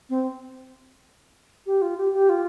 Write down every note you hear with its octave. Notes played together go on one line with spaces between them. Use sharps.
C4
G4
F4
G4
G4
F4